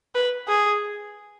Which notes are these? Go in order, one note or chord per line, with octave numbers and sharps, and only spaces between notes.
B4
G#4